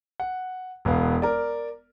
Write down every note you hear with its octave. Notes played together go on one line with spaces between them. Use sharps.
F#5
E1 B3 F5
A#4 D5